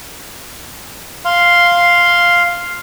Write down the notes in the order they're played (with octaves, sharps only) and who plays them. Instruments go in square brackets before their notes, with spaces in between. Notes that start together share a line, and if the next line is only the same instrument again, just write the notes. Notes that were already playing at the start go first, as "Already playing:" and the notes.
[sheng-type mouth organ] F5 C6